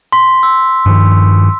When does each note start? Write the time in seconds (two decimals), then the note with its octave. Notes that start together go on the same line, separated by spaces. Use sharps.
0.12 C6 B6
0.43 E6
0.86 G2 D#3 F3